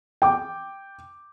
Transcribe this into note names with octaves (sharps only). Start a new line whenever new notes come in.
G5 D6